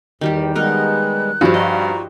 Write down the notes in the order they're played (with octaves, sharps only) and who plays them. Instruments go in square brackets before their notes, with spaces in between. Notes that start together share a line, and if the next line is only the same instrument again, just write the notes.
[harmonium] E2 [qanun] D#3 G3 G4
[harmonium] G3 G#3 B3 [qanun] D#4 A#4 [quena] F#6
[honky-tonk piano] G2 F3 [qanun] F#4 G4
[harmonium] F4 F#4 [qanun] D#5 [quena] A#5